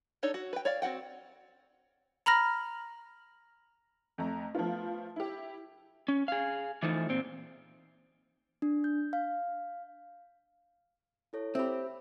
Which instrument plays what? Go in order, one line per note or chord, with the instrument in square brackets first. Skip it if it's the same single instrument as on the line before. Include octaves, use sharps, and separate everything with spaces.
[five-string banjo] D4 D#4 A4 C#5
F#4
B4 G5
C#5 D5 F5
C4 F#4 F#5 G5
[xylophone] A#5 B5 F6 A#6
[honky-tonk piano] F2 A3 A#5
F3 A3 B3 F4
E4 G4
[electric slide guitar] C#4
G#4 F5
E3 F3 A3 D#4
A#2 C4
[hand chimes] D4
G6
F5
E4 A4 C#5
[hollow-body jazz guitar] C4 G4 [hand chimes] E5 B5